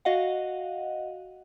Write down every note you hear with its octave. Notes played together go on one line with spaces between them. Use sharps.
F#4 D#5 F5 F#5